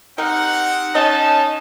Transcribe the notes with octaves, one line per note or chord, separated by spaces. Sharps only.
C4 D#4 G4 A#4 F#5
C#4 D#4 D#5 A5